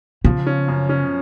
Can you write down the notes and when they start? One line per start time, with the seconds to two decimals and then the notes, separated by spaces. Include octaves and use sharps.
0.25 C#3 F3
0.46 C#4
0.68 F#2
0.89 C#4